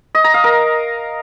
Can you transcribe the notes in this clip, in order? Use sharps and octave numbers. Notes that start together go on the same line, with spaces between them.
D#5
A#5
F5
A#4